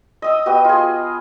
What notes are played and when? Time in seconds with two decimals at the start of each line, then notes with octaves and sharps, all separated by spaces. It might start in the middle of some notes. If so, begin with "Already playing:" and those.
0.22 D#5 D#6 E6
0.46 B3 F#4 G4 D#5
0.65 F4 G#4